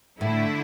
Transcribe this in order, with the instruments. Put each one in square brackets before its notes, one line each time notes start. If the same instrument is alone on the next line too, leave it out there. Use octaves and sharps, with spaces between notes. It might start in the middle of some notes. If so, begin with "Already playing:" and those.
[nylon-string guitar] A2 [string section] D3 A3 E4